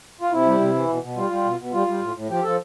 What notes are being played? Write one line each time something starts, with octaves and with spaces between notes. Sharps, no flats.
F4
C3 E4
G3
C3
E3
B2
B2
G3 F4
G3
B2
B2
G3 F4
G3
A2
A2
F3 G4
F3 A4